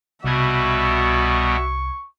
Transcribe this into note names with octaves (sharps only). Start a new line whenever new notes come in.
C2 B2 G3 B3 F#4 E5 C#6 G#6